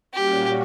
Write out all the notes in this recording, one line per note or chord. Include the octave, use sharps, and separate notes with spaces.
A#2 G3 A#3 C#4 F#4 G4